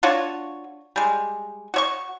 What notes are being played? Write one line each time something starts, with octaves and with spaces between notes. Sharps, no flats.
D4 F4 F#4 C#5
G3 G#3
F#4 C#5 C#6